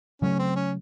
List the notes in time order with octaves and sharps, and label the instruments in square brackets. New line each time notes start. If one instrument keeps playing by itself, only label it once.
[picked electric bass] C#3 F#3 A3 [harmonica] C#4
[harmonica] C4
C#4